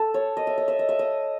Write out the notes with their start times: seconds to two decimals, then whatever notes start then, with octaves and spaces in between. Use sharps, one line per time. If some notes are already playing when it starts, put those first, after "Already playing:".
Already playing: A4
0.14 C#5
0.37 D#5
0.47 E5
0.58 D#5
0.68 E5
0.79 D#5
0.89 E5
0.99 D#5